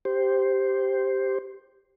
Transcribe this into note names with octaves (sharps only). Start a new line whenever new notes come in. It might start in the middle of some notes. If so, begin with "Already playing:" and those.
G4 C5